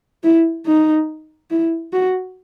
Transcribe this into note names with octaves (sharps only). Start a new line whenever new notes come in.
E4
D#4
E4
F#4